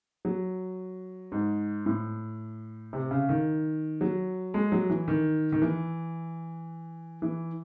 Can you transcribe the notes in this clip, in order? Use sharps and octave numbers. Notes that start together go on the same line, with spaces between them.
F#3
G#2
A2
C3
C#3
D#3
F#3
G#3
F#3
E3
D#3
D#3
E3
E3